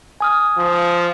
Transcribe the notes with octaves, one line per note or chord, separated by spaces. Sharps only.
G#5 D#6 F6
F3